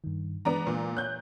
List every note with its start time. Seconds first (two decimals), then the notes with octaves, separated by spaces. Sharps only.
0.04 G2 D#3
0.45 E3 G#3 B3 D4 A#5
0.67 A#2
0.97 C#5 F#6 G6